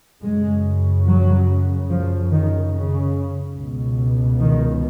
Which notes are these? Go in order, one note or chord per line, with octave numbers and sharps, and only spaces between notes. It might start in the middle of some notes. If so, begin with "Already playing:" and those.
F#2 C#3 G#3
F#3
F3
D#3
C#3
C#2 B2
D#3